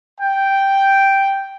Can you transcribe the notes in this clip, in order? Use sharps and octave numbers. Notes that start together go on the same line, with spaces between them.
G5